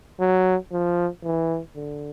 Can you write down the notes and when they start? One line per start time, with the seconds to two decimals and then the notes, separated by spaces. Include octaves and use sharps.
0.20 F#3
0.72 F3
1.24 E3
1.76 D3